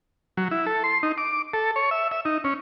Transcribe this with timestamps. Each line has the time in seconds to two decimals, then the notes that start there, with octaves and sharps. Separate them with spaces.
0.37 F#3
0.51 E4
0.66 A4
0.84 C6
1.03 D#4
1.18 D6
1.53 A4
1.76 C#5
1.91 E5
2.11 E5
2.25 D#4
2.44 C#4